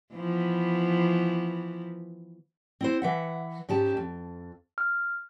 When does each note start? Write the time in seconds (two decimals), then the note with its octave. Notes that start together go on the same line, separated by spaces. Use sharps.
0.14 E3 F3 B3
2.81 C4 E4 C5
3.02 E3 E5 F#5
3.69 G#2 C#4 G4 A5
3.97 F2
4.78 F6